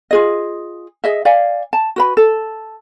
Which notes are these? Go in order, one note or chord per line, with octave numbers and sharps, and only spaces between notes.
F4 G#4 D#5
G#4 D#5 E5
D5 F5 G#5
A5
F#4 B4 B5
A4